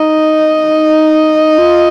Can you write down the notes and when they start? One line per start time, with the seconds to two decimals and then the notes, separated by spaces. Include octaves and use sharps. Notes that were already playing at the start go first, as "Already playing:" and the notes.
Already playing: D#4 D#5
1.58 F4